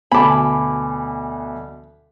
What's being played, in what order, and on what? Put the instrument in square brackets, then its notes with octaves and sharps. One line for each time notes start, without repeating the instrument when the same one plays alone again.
[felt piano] D2 B2 [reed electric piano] G#5 D6 [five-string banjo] A5 B5